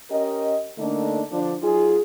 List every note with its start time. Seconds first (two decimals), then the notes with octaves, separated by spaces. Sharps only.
0.11 C#4 G4 A#4 D#5
0.78 D3 A3 A#3 D4 D#4
1.32 D3 F3 D4
1.63 F#3 D#4 F4 G#4